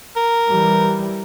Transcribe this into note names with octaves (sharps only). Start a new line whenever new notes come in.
A#4
E3 G3